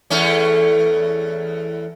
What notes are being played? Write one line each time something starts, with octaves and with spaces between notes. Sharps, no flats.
E2 A3 C#4